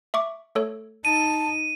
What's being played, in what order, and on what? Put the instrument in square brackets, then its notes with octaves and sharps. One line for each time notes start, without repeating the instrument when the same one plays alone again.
[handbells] E5 C#6 D6
A3 A4 C#5
[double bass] D#4 [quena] A5 [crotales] D#7